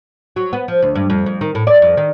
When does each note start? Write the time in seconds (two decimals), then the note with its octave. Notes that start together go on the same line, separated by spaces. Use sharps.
0.36 F#3
0.53 B3
0.68 F3
0.82 D2
0.95 G2
1.10 F2
1.26 F2
1.41 D#3
1.55 A2
1.67 D5
1.82 F2
1.97 D#3